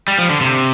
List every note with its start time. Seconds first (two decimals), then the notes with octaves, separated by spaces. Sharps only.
0.08 G3
0.19 F3
0.29 D3
0.41 C3